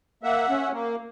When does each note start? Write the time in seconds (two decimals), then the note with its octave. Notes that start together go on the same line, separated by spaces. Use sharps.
0.23 A#3 E5 F#5
0.49 C#4
0.73 A#3